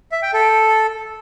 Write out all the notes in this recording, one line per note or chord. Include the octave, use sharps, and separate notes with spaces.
E5
G5
A4